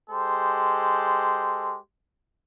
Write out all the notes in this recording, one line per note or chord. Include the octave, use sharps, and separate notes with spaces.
G#3 G4 A4 C5